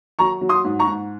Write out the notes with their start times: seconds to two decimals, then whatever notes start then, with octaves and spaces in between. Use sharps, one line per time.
0.19 F#3 A#5 C#6
0.41 F#3
0.49 C6 D#6
0.65 G#2
0.79 A#5 C#6
0.87 G#2